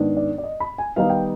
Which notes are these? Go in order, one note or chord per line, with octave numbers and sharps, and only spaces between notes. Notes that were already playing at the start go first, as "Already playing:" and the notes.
Already playing: G#2 D#3 B3 D4
D5
D5
D#5
B5
G#5
D#3 G3 B3 D#4 F5
G5